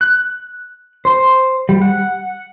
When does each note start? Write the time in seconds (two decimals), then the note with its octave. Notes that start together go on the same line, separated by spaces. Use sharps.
0.01 F#6
1.05 C5
1.69 G3
1.81 F#5